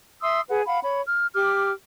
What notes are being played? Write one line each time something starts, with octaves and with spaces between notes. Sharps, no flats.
E5 C6 D#6 E6
G#4 B4 F#5
F5 F#5 B5
C#5 B5
F6
G4 D6 F6